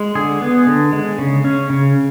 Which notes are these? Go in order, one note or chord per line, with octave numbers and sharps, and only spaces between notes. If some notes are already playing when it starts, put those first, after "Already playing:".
Already playing: G#3
D3 G#4
B3
D3
G#3
C#3
C#4
C#3